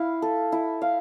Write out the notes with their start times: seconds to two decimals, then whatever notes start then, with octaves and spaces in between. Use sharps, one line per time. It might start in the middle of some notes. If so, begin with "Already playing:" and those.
Already playing: E4 F5
0.22 A4
0.52 E4
0.82 F5